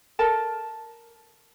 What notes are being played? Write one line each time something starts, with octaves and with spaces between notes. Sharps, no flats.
A4 A#4 A5